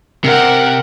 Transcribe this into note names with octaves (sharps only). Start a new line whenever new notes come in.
C3 A#4 F#5